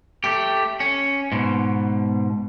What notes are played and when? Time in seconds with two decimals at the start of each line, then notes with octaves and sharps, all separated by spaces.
0.24 A3 G4
0.80 C#4
1.32 G#2 B2